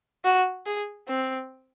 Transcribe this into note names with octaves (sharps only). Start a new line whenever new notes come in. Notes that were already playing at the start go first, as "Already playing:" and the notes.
F#4
G#4
C4